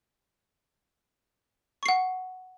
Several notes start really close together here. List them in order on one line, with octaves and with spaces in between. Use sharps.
C#6 C7 F#5